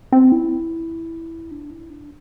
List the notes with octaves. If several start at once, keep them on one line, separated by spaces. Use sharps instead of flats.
C4
E4
D4
E4
D4